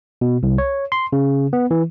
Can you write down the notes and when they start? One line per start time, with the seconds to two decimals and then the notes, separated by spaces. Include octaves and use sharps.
0.21 B2
0.43 C2
0.58 C#5
0.92 C6
1.13 C#3
1.53 B3
1.71 E3